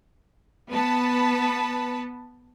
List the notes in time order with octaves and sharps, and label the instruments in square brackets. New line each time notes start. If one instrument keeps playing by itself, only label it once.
[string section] B3 B4 A5 B5